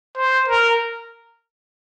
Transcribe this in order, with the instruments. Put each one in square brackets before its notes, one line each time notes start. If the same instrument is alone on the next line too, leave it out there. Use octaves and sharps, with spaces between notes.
[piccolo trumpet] C5
A#4